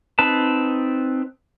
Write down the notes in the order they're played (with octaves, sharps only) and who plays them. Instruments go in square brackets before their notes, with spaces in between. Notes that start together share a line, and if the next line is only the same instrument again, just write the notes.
[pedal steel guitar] C4 D#4 B4 A5